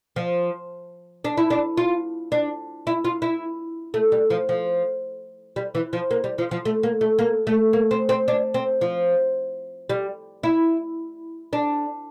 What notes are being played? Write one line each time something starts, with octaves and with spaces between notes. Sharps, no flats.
F3
D4
E4
D4
F4
D4
E4
F4
E4
A3
G3
F3
F3
G3
E3
F3
A#3
G3
F3
F3
A3
A#3
A3
A#3
A3
A#3
C4
C4
D4
C4
F3
G3
E4
D4